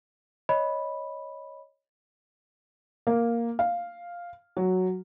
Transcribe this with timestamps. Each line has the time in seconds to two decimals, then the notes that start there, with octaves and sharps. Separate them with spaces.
0.49 C#5 D#5 B5
3.07 A#3
3.59 F5
4.57 F#3